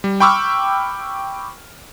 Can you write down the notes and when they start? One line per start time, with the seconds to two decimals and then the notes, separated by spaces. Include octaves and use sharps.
0.04 G3
0.20 G5 B5 C#6 D6 E6 F6